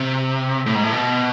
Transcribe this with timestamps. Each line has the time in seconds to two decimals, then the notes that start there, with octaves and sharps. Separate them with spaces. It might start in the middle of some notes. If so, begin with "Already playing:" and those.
Already playing: C3
0.66 A2
0.75 G#2
0.83 A2
0.92 B2